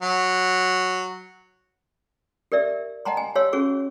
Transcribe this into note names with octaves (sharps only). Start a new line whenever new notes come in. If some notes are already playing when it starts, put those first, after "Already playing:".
F#3
G4 A#4 D5 E5
D#5 F#5 G5 A5 A#5 C6
G#5
G4 C#5 F5 C6 E6
C#4 F#4 G#4 C#6